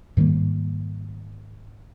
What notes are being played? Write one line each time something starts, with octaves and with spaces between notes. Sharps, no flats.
G#2 D#3 G3 A#3